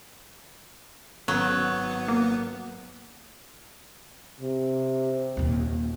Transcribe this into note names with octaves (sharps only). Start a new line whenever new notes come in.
G#1 F#3 B3
A#3
C3
D#1 D#2